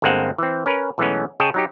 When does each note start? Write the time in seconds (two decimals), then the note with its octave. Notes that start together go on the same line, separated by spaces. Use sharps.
0.02 G1 G2 G#3 A#3 C4 F#5
0.38 E3 C4
0.66 C#4 A#4 B4
0.98 B1 E3 G#3 A3 B3 C#4
1.40 C#3 G#4 C#5 D#5 G5 A5
1.54 F#3 D#4 G4